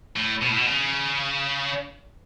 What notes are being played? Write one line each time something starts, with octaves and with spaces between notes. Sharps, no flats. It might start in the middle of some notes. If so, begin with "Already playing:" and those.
A2
B2
A2
B2
C#3